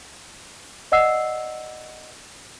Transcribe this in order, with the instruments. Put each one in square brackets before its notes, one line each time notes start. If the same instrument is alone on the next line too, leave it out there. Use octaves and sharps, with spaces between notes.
[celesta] D5 D#5 F#5 E6 C7